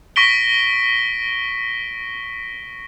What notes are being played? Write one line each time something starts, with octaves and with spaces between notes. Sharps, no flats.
C#6 A#6 B6 D7 G7